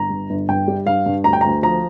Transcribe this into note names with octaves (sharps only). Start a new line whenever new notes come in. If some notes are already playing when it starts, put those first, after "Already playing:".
Already playing: G1 A#5
G2
G1
G2 G5
G3
G2 F5
G2
D2 A#5
G5
D2 A#5
F3 A#5